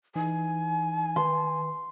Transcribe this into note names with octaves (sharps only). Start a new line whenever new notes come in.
E3 D#4 G#5
D#3 B4 C6